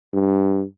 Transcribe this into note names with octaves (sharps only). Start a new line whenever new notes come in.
G2